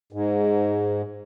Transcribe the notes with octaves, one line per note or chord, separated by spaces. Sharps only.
G#2